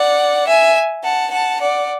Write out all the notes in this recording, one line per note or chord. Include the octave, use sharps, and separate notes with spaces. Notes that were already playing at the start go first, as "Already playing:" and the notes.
Already playing: D5 F#5
E5 G#5
F#5 A5
F#5 A5
D5 F#5